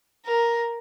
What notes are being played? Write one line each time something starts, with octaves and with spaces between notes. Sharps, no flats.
A#4